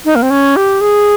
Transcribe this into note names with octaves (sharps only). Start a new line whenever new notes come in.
D#4
A#3
C4
C#4
G4
G#4